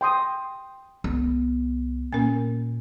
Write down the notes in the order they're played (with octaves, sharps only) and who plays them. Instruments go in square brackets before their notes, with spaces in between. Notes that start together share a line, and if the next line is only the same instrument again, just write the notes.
[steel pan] G5 C6 D#6
[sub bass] C2 [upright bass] B3
[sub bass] A#2 [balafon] A#3 C#4 A#4